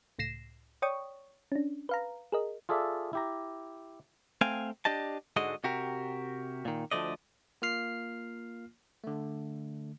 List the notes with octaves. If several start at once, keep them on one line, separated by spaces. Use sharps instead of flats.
C#2 A2 A#6 C7 E7
C#5 D5 G5 C#6 D#6
C#4 D4
B4 F5 A#5
G#4 A#4 D#5
F4 G#4 A4 D5 E5
E4 G4 A#5
A3 C4 F5 G5 G#5
D4 G4 D#5 A5
G#2 D3 G#3 F#4 D#5
C3 F#4 G4 A#4
A#2 D#3
D2 A#2 F3 A3 D5 D#5
A#3 F4 F6 C7
D3 A3